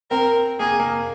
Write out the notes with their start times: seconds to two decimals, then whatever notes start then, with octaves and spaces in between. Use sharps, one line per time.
0.11 C4 A#4
0.59 A#3 G#4
0.80 A#3